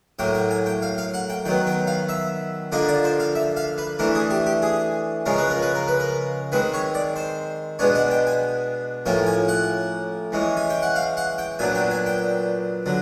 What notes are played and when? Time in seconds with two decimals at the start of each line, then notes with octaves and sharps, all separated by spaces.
0.19 A2 F#3 A#3 G5
0.35 G5
0.51 G#5
0.66 G5
0.82 F5
0.98 F5
1.14 F#5
1.30 G5
1.45 D#3 F#3 B3 G5
1.67 G5
1.87 F5
2.09 E5
2.72 D3 F3 A#3 D4 D#5
2.88 D5
3.04 C5
3.20 F5
3.35 E5
3.56 F5
3.78 B4
3.99 E3 A3 D4 A#4
4.15 G#4
4.30 G4
4.46 G4
4.62 G#4
5.26 C#3 F3 G#3 C#4 A#4
5.38 B4
5.50 A#4
5.62 B4
5.75 A#4
5.88 B4
6.00 A#4
6.52 D#3 G#3 C4 B4
6.74 C#5
6.95 D5
7.16 C5
7.79 B2 G#3 B3 D4 C#5
7.95 F#5
8.11 G5
8.27 G#5
9.06 A2 F3 A#3 C#4 G5
9.27 G#5
9.48 F#5
10.32 E3 G#3 C#4
10.57 G#5
10.70 G5
10.82 F#5
10.96 F5
11.17 F#5
11.38 G5
11.59 A#2 F#3 B3 D4 G#5
11.75 G5
11.91 G#5
12.06 G5
12.86 D3 F#3